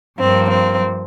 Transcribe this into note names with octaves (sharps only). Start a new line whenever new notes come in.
G2 F3 A#3 C4
C4